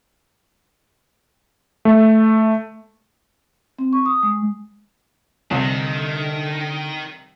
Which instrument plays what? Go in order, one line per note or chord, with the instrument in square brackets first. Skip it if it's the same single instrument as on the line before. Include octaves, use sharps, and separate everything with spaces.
[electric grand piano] A3
[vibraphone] C4
C#6
D#6
G#3
[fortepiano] C2 [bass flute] D3 [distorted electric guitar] D#3